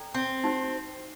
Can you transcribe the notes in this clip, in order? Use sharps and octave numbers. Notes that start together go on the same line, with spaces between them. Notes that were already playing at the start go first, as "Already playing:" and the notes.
Already playing: A4 D5 G5 A#5
C4
D#4 F#4 C5